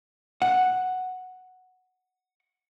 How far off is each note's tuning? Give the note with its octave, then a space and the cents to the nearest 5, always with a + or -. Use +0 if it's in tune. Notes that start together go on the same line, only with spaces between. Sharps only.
F#5 +0